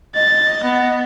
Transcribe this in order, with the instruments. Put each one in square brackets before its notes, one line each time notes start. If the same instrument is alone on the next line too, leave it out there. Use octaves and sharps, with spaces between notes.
[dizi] D#5 [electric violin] A6
[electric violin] B3